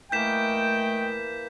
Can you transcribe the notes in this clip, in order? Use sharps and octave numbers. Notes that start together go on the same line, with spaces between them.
E3 A3 A#3 D#5 G5 G6 B6 E7